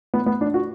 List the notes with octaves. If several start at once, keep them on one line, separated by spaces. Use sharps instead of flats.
B3
B3
D4
F#4